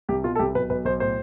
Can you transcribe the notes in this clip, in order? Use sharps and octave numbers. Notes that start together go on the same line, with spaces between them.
C2 G4
B2 F4
A4
C2 G4
B1 B4
B1 B4
B1 C5
A2 C5